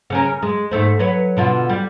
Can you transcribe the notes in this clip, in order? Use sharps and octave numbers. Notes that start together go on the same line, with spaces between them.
C#3 C#4 A#4
G#3
G#2 A3 C5
F#3 B4 C#5
B2 D3 F4
G3